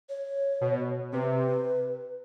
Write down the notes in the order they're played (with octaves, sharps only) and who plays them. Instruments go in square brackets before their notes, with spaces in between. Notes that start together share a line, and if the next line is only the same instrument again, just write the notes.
[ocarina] C#5
[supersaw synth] B2
[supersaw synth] C3 [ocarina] B4